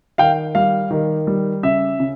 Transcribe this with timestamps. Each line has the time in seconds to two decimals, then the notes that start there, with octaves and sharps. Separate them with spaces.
0.18 D#3 F5 G5
0.55 G3 F5
0.91 D#3
1.27 G3
1.63 C#3 E5
2.00 C#3